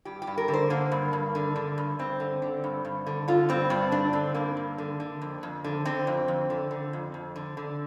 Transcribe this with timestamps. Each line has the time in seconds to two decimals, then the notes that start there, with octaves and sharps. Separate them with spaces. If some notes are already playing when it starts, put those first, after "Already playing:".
0.05 G2 G4
0.22 G4
0.27 G2
0.38 A#4
0.48 D3
0.54 C5
0.70 D3 A#3
0.92 G2
1.13 G2
1.35 D3
1.56 D3
1.78 G2
1.99 G2 C4
2.20 D3
2.42 D3
2.64 G2
2.85 G2
3.07 D3
3.28 D3 F4
3.49 G2 C4
3.70 G2 D4
3.92 D3 D4
4.13 D3 C4
4.34 G2 A#3
4.57 G2
4.78 D3
5.00 D3
5.22 F2
5.43 F2
5.64 D3
5.85 D3 C4
6.07 F2
6.28 F2
6.50 D3
6.71 D3
6.93 F2
7.14 F2
7.36 D3
7.57 D3